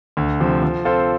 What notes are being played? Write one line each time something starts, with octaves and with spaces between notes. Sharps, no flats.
D2
C3 F3
F3
C4 F4 A4 C5